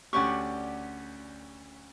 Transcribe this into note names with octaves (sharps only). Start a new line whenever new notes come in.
D2 C#4 G4 D5 F#5 C#6